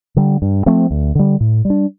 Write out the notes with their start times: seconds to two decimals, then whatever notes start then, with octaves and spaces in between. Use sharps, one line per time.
0.16 D3 G3
0.42 G2
0.66 F3 A3 C4
0.91 D2
1.15 D3 G3
1.40 A2
1.65 G3
1.70 D4